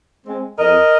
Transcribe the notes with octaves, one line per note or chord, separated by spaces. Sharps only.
G#3 C4
F2 A#4 D#5